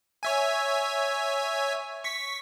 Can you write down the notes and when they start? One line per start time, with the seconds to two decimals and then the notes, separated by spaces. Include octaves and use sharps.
0.23 C#5 E5 G#5
2.04 C#6 B6